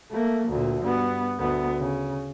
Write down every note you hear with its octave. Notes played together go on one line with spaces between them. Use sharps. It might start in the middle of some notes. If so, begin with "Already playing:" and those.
A3 A#3
D2 A#2
G2 B3
D2 B3
C#3